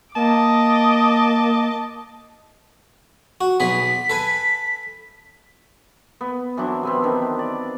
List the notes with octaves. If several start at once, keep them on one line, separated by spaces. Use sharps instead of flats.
A#3 D#5 A5 D6
F#4
B1 B3 G#4 B6
A4 B4 G#5
B3
E3 F#3 C4 D4
C3 B3 C4
D#3 D4
D5